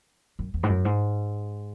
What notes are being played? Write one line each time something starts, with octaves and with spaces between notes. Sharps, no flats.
F#2
E2
G#2
F#2
G#2